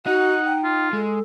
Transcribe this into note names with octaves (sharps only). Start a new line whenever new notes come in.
D#4 F#4 D#5 F#5
G5
F4
G#3 A4